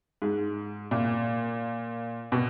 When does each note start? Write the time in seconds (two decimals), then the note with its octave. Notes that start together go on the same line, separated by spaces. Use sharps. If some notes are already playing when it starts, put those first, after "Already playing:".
0.22 G#2
0.91 A#2
2.32 B2